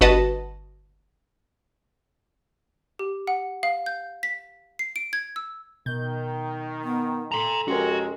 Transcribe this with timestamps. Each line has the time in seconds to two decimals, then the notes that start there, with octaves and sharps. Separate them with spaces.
0.01 G1 F#4 B4 D#5 A5
2.99 G4
3.27 F#5
3.63 F5
3.86 G6
4.23 B6
4.79 C7
4.96 D7
5.13 G#6
5.36 E6
5.86 B2 D#3 G6
6.83 B3
7.32 A4 A#5 C6
7.68 F2 G#3 C#4 F#4 G4 A#4